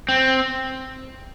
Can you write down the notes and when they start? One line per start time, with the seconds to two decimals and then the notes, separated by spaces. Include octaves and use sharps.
0.09 C4